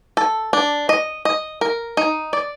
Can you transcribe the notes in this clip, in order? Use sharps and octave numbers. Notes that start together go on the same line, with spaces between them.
A4
D4
D#5
D#5
A#4
D#4
D5